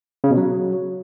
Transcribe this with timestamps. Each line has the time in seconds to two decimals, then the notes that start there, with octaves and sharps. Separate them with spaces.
0.24 C#3
0.30 B2
0.37 F#3